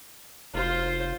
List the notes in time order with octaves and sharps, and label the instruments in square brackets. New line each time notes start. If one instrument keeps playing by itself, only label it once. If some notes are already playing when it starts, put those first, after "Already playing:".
[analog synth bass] F1 [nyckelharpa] F4 C5